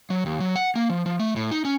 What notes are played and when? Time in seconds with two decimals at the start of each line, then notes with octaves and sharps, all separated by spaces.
0.10 F#3
0.26 D#2
0.40 F#3
0.56 F#5
0.76 A#3
0.90 F3
1.06 F3
1.20 A3
1.36 A2
1.51 D#4
1.65 C#4